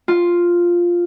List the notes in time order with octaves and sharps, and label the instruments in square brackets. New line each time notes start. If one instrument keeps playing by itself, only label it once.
[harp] F4